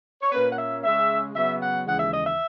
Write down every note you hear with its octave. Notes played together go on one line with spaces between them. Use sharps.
C#5
A#2 A#3 C#4 B4
F#5
E5
C#3 G#3 C#4 E5
C#3 F#3 B3 E5
F#5
D#2 C#3 E3 G#3 F#5
E5
D#5
E5